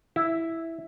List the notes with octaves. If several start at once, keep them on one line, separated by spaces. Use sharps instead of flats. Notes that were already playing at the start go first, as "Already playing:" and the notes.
E4